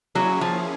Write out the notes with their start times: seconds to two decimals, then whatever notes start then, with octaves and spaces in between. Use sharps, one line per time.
0.15 F#3 A#3 C#4 E4 G#4
0.41 F3